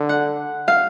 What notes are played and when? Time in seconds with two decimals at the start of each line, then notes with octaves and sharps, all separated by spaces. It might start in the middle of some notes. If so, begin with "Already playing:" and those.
Already playing: D3
0.09 F#5
0.68 F5